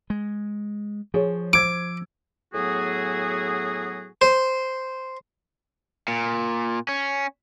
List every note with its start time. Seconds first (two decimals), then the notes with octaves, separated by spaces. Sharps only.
0.10 G#3
1.14 F3 G#4 C#5
1.53 C5 D6 E6 G#6
2.54 A2 F#3 B3 F#4 G#4
4.21 C5
6.08 A#2
6.89 C#4